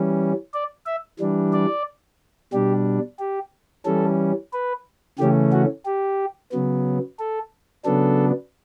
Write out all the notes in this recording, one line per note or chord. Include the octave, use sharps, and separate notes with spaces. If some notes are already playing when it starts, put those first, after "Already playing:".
Already playing: E3 G3 C#4
D5
E5
E3 G3 D4
D5
B2 G3 D4 G4
G4
E3 G3 C#4 A4
B4
C#3 E3 A3 C#4 G4
F#4
G4
C#3 F#3 B3
A4
C#3 F#3 B3 D4 A4